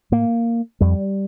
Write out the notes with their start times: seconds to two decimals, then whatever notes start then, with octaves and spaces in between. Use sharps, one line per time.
0.12 A2 A#3
0.81 F2 G3